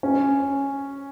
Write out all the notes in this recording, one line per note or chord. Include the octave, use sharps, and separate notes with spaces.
C#4